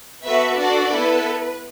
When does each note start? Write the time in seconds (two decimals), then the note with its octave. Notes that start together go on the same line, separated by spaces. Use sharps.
0.25 B3 F#4 A4 B4 E5
0.58 D4 F#4 A4 D5
0.91 B3 E4 A4 B4